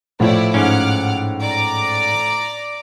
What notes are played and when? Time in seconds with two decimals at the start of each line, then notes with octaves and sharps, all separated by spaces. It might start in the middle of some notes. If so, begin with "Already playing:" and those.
0.20 A2 F3 E4 C#5 D5
0.54 G#2 C#4 F#5 D6 F6
1.41 D5 A#5 D6